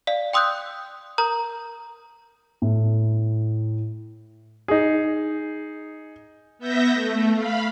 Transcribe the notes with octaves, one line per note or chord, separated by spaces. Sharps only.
D5 F5
G5 C6 D#6 E6 F#6 G6
A#4 A#5 D#6 G6
A2
D#4 G#4
B3 E5 G6 A#6
A3
F5 B5